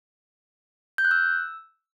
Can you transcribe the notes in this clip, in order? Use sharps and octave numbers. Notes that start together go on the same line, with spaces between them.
G6
F#6
E6